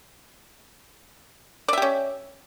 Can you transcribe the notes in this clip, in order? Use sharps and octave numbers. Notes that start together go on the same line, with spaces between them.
C#4 G4 D5 E5